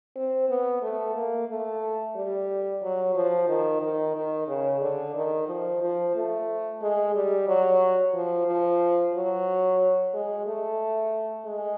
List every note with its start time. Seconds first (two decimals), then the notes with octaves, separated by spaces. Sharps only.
0.16 C4
0.49 B3
0.82 A3
1.15 A#3
1.49 A3
2.16 G3
2.83 F#3
3.15 F3
3.48 D#3
3.82 D#3
4.15 D#3
4.48 C#3
4.81 D3
5.15 D#3
5.48 F3
5.82 F3
6.15 A3
6.82 G#3
7.15 G3
7.48 F#3
8.14 F3
8.47 F3
9.15 F#3
10.14 G#3
10.47 A3
11.46 G#3